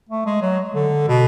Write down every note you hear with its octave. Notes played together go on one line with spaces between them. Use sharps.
A3
G#3
F#3
D3
B2